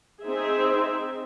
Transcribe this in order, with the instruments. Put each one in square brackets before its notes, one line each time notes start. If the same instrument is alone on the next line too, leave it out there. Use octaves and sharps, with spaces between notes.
[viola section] C4 D#4 G#4 E5